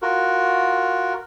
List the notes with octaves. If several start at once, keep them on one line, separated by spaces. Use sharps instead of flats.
F4 F#4 A#4